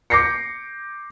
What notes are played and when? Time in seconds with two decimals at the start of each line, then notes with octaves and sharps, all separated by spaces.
0.10 D6 G6 A#6 C7 C#7